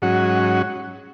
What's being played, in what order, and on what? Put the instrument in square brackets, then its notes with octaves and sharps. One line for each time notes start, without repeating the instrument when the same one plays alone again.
[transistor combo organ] G#2 F#3 C#4 F#4